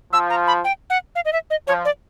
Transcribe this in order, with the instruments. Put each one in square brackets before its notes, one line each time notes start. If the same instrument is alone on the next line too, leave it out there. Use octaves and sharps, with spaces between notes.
[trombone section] F3 [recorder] E6
[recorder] A#5
B5
G5
F#5
F5
D#5
E5
D#5
[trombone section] F3 [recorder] C#5
[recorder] D5